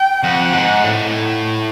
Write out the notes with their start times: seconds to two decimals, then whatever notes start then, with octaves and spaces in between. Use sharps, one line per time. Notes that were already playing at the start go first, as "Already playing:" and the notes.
Already playing: G5
0.23 F2 F#5
0.53 G#2
0.84 A2